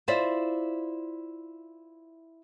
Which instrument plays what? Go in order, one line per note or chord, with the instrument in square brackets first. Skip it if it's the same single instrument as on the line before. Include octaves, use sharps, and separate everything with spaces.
[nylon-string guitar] E4 F4 C5 D5 E5